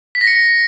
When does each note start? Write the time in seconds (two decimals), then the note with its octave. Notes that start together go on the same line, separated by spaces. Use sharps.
0.15 B6
0.21 A#6
0.27 C#7